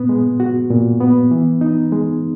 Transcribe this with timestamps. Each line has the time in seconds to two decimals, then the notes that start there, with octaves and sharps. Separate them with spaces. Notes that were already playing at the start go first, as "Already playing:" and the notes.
Already playing: A#2 B3
0.09 G#3
0.40 F#4
0.71 A#2
1.01 B3
1.31 E3
1.61 D#4
1.92 G#3